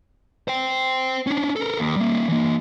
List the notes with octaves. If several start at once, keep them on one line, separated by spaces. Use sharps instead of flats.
C5 G5
C#4 D4
A4 A#4
D#2
G3 A#3
E3 A#3